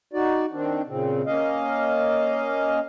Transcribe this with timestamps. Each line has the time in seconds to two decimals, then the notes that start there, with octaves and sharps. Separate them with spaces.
0.13 D#4 F#4 D5
0.52 D#3 C4 D4
0.87 A#2 C#3 C4
1.26 A#3 C#4 D#5 F5